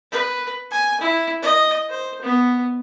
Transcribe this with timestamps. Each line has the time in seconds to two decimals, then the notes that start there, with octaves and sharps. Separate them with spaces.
0.12 B4
0.71 G#5
1.01 E4
1.42 D#5
1.89 C5
2.22 B3